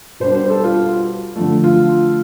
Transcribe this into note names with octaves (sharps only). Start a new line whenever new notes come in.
B2 G3 D4 C5
C5
A4
F4
D3 F3 A3
F4